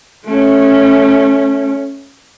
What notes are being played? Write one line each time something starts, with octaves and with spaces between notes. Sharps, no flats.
A3 C#4